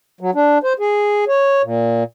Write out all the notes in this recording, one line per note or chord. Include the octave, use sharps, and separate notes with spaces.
F#3
D4
C5
G#4
C#5
A#2